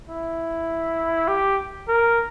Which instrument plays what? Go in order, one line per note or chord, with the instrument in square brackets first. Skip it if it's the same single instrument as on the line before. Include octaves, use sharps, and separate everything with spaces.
[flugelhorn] E4
G4
A#4